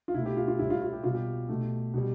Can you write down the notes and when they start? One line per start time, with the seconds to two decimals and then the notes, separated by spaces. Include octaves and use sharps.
0.08 F4
0.14 B2 A3 E4
0.26 G4
0.37 F4
0.48 F4
0.59 A2 G3 E4
0.70 F4
0.82 F4
0.93 G4
1.04 B2 G3 F4
1.14 G4
1.49 B2 A3
1.94 B2 G3